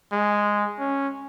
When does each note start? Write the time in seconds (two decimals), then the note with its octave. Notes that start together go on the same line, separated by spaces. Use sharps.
0.12 G#3
0.79 C#4